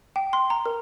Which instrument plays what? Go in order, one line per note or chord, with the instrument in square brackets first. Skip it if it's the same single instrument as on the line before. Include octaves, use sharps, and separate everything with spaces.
[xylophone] G5
C6
A#5
A#4